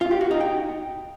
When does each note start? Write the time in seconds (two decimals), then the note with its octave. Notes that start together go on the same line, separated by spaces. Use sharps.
0.01 F4
0.11 G4
0.21 F#4
0.31 D#4
0.41 G5